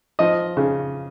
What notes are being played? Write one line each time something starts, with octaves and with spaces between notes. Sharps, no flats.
F3 D#5
C#3